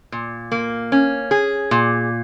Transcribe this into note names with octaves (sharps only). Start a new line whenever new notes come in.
A#2
A#3
C#4
G#4
A#2